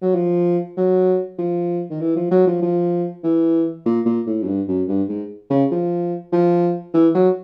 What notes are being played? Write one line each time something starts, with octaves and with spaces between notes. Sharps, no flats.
F#3
F3
F#3
F3
D#3
E3
F3
F#3
F3
F3
E3
A#2
A#2
A2
F#2
G2
F#2
G2
G#2
C#3
F3
F3
E3
F#3